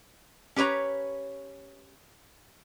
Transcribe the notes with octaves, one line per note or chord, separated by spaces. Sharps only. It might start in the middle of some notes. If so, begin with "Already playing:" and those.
C#4 G4 B4 C#5 A#5